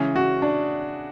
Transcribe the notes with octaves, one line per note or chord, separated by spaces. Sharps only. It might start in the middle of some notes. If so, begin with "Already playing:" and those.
Already playing: C#3 E3 G#3 C#4 G#4
F#4
D4